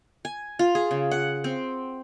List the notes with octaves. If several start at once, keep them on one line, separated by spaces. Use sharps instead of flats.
G#5
F4
G#4
C#3
F#5
C4